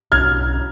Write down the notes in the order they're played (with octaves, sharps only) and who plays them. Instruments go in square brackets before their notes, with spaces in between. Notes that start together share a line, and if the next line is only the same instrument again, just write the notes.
[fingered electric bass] B1 [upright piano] F6 G#6